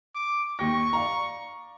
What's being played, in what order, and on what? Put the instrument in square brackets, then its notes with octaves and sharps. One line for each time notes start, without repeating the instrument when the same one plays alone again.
[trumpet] D6
[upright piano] D#2 G5 A#6 [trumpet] C#6
[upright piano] D5 F5 A#5